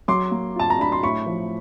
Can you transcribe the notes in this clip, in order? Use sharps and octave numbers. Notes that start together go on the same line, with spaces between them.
F#3 C6 D6
A#3
F4 A5
A#5
D4 B5
C6
A2 B5 C#6
F3